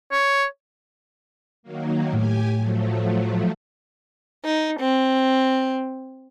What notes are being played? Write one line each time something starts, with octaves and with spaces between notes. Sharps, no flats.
C#5
D#3 F#3 A#3
A2 G4 G#5
F3 F#3 A3
D#4
C4